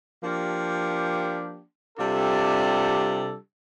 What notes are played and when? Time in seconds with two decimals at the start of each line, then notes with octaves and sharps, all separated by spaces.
0.22 F3 A#3 D4 G4
1.96 C3 G3 D4 F4 A4